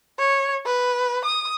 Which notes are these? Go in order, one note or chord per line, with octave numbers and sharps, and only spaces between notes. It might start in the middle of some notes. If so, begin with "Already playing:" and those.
C#5
B4
D#6